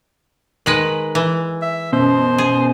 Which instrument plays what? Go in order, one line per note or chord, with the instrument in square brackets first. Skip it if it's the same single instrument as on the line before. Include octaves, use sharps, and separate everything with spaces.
[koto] D#3 G#3 B4 [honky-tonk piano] F#7
[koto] E3
[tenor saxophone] E5
[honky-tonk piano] F#2 B2 [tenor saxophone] C5
[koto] G#4